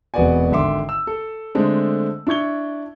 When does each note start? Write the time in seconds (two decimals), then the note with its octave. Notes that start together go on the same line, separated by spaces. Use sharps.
0.14 E1 C3 B3 F#4 D5 G#5
0.51 G#1 D3 E5 C6 D6
0.89 E6
1.07 A4
1.55 D3 G#3 A3 C4 D4
2.27 D4 E4 C#6 G#6 G7